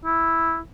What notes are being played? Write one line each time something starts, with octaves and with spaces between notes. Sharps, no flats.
E4